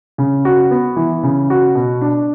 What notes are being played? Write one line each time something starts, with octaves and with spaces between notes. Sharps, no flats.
C#3
F#4
B3
E3
C#3
F#4
B2
D4